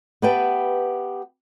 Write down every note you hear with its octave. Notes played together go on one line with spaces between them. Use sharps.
B3 G4 B4 E5 G5 A5